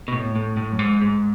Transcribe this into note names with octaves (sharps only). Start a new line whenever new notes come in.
B2
A2
A2
A2
F#2
G#2
G#2